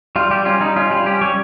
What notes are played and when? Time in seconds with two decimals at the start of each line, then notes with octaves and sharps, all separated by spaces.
0.16 G3 F4
0.30 G3 G4
0.45 C#4 F4
0.61 G3 D#4
0.76 C#4 F4
0.91 G3 F4
1.06 C#4 G4
1.21 G3 C#5